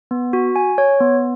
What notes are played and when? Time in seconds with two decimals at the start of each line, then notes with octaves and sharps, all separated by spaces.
0.11 B3
0.33 F#4
0.56 G#5
0.78 C#5
1.00 B3